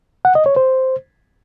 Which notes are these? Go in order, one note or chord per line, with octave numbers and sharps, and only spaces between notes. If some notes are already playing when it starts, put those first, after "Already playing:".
F#5
D#5
C#5
C5